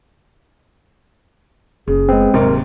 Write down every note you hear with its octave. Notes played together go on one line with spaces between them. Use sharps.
F#1 C#3 G#4
G#3 B3 C4
D#1 D#2 G#2 C3 F#3 A#4